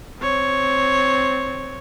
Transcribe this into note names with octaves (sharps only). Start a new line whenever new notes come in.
C4 C#5